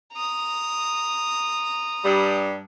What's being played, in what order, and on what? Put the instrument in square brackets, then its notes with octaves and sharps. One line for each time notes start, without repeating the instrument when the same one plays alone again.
[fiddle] A#5 D#6
[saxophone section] G2 G3